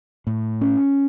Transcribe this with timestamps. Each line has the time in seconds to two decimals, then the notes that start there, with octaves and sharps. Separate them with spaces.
0.27 A2
0.61 C#4